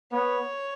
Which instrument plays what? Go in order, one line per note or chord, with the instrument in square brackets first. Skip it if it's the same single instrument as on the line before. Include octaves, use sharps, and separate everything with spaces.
[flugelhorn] B3 [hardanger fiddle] C#5